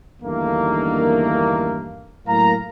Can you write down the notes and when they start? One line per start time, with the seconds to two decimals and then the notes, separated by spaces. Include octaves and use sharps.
0.23 E2 G2 D3 D#3 A3 A#3
2.27 A2 F#3 A#3 A#4 F5 A#5